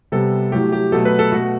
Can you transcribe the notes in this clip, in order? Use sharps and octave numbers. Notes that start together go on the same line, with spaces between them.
C3 G3 B3 A4
A2 F#3 A3 G4
G4
B2 F#3 A3 A4
B4
A4
B2 A3 F#4